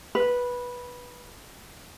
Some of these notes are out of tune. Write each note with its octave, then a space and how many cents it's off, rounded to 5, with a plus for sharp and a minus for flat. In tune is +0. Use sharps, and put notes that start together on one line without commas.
B4 -10